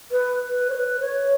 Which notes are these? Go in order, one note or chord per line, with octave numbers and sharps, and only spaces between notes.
B4
B4
C#5
B4
C#5